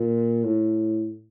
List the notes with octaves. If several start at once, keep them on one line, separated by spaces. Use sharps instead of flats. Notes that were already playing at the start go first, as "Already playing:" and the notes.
Already playing: A#2
A2